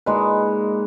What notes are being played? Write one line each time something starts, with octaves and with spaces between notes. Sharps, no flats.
A#2 G#3 D#4 B4